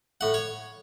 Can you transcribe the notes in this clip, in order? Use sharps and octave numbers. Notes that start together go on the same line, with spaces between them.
A2 F#5
C#5